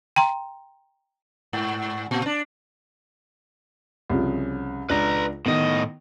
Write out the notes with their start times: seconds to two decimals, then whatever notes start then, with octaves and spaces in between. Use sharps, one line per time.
0.16 G5 A#5 C6
1.53 G#2
2.11 A#2
2.26 D4
4.10 C2 C#3 F3
4.89 C#2 D4 B4 A#5
5.46 A2 D#3 B3 D#5